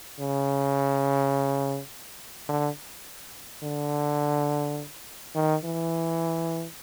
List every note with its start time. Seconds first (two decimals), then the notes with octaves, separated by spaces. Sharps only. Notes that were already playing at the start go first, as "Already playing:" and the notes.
0.19 C#3
2.48 D3
3.63 D3
5.35 D#3
5.64 E3